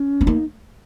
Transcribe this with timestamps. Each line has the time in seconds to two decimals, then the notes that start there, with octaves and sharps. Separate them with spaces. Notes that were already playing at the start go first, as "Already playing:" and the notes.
Already playing: C#4
0.21 B3
0.27 A#3 D#4